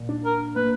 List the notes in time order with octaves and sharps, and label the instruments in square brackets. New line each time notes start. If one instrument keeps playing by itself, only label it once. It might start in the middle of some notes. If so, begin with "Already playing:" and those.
Already playing: [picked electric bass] A#2
D4
[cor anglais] A#4
[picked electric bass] A#3 [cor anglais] B4